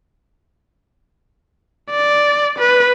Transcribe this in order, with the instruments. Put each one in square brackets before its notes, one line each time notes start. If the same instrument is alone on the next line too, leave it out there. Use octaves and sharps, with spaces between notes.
[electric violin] D5
B4